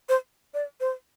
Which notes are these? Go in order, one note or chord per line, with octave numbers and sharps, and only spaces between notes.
C5
D5
C5